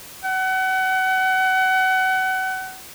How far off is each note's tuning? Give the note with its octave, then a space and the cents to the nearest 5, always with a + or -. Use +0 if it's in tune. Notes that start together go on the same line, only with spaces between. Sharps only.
F#5 +30